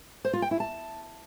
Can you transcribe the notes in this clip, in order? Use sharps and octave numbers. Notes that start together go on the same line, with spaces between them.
C5
F4
G5
E4
A5